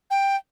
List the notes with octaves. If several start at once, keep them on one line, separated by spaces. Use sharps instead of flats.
G5